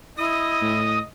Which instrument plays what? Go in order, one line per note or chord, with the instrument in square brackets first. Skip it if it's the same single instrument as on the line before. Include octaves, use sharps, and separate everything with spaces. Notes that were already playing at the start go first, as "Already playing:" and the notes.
[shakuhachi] E4 [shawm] D#5 [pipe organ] D#6
[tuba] A2